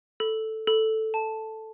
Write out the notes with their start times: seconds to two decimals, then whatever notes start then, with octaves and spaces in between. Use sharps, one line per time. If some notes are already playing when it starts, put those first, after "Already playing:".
0.20 A4
0.67 A4
1.14 A5